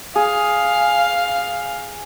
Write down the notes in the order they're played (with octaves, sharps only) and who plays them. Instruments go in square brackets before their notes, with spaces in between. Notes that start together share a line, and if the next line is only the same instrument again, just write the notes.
[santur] G#4 [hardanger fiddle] F5